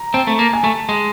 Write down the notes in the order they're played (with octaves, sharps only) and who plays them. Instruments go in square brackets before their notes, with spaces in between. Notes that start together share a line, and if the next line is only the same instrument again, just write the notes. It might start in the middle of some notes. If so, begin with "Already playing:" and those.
Already playing: [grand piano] A#5
[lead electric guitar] C4 [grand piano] A5
[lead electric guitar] A3
A#3
[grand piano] G#5
[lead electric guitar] A3 [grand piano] A5
[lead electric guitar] G#3